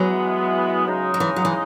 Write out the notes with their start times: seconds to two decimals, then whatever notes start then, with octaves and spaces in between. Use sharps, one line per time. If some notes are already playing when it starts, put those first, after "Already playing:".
Already playing: E3 F#3 G#3 B3
0.87 C#3 G#3 D#4
1.14 F#3
1.20 E3
1.36 F#3
1.45 E3